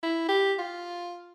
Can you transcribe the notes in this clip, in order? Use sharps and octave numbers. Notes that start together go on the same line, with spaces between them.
E4
G4
F4